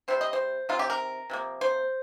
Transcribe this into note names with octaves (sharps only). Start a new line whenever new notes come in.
C3 G3 C4 C5
D#5
C5
C3 D#3 C4 F4
G4
A#4
C3 F3 A#3
C5